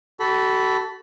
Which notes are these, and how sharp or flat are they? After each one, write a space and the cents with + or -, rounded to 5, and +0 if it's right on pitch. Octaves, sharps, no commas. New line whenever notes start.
F#4 +45 A4 +0 B5 +0